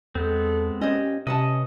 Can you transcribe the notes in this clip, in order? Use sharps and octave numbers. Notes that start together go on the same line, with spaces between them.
E2 G#3 B3 C4 A4
A#2 C#4 G4 C5 C#5 D#5
C3 C#4 B4 D#5 F#5 A5